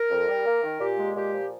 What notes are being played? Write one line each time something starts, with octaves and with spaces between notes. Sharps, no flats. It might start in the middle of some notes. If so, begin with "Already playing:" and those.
Already playing: A#4
F2
G3
A#3
D#3
A#2 G4
G#3
A#2 G4
F3